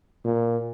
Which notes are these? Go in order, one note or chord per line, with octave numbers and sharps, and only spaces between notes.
A#2